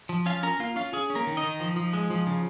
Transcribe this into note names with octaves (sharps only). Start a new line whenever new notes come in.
F3
C#4 F4 F5
C#4 A#4 A#5
A#3 F4 F5
C#4 F4 F5
C#4 G#4
C#4
A#3 A#4
D#3
D#4 D#5
D#3
F3
F3
G#3
F3
C#3